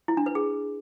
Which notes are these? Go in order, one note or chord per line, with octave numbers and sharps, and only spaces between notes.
E4
D4
B4
G#4